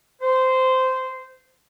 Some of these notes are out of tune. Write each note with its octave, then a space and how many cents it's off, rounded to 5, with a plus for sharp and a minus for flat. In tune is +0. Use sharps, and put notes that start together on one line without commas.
C5 -15